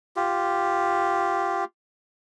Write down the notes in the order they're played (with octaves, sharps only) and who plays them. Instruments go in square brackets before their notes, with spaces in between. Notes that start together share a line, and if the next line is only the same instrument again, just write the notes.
[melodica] F4 G4